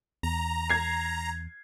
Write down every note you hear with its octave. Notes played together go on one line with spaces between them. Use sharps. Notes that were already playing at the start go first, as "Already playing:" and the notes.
E2 A#5
G#6 C7